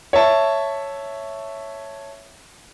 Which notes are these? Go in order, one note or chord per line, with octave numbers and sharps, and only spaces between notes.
C#5 E5 A5